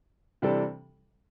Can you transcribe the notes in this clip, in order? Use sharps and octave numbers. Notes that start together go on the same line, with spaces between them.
C3 E3 G3 D4 A4